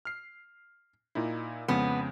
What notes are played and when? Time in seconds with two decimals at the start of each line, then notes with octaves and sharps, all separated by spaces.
0.05 F6 C7
1.15 A#2 D#4 E4
1.68 F2 C#3 G#3 B3